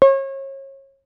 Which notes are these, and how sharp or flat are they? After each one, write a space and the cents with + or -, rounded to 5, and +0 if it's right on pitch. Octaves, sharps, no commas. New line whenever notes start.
C#5 -35